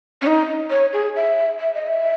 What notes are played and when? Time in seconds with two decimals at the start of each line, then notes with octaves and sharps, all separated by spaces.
0.22 C#4
0.27 D#4
0.70 C#5
0.93 G#4
1.16 E5
1.60 E5
1.74 D#5
1.87 E5